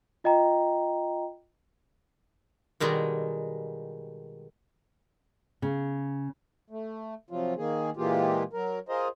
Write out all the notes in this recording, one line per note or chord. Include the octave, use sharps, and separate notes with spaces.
F4 D#5 G5 A#5
B2 D#3 G3 G#3
C#3
A3
C3 F3 F#3 F4
D#3 A#3 G#4
A#2 E3 G#3 A#3 F4 G4
F#3 A#4
F4 G#4 A#4 C5 D#5